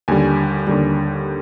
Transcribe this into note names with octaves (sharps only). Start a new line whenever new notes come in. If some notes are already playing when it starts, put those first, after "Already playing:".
D#2 D3 G3 G#5
D#2 D3 G3